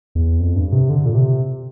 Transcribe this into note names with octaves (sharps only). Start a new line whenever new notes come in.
E2
F2
G2
C3
D3
A#2
C3